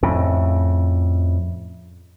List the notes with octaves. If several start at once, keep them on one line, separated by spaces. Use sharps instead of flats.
F2 A2 C#3